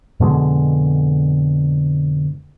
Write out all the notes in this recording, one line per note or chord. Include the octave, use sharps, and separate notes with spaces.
F2 B2 D3 G#3